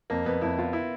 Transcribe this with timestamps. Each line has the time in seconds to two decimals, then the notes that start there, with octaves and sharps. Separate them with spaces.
0.10 F2 A#3
0.26 F2 B3
0.41 F2 E4
0.58 B3 F4
0.73 E4